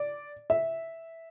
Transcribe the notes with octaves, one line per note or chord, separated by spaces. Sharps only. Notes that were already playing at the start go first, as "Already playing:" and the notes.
Already playing: D5
E5